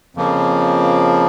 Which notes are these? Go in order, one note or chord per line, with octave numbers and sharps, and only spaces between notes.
F2 C#3 F3 A#3